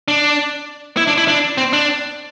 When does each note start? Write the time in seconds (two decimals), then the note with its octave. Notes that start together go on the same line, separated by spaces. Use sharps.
0.08 D4
0.97 E4
1.07 D4
1.18 E4
1.28 D4
1.58 C4
1.73 D4